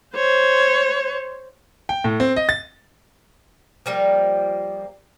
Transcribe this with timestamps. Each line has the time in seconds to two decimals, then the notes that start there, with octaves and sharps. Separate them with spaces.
0.15 C5 C#5
1.89 G5
2.04 A2
2.20 C4
2.36 D#5
2.49 A6
3.86 F3 G3 A#3